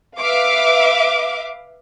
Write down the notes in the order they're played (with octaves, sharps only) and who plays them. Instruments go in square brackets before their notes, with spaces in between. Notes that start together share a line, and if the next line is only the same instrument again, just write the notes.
[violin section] B4 E5 F5 D6